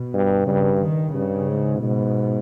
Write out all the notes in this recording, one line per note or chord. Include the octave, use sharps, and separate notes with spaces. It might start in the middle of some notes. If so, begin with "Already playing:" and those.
Already playing: B2
G2
G2 C#3
D#3
G2 C#3
G#2
G#2 B2